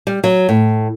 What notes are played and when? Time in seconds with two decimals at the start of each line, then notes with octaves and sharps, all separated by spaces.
0.07 G3
0.24 F#3
0.49 A2